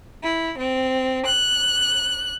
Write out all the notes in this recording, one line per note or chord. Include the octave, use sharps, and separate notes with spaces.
E4
C4
F#6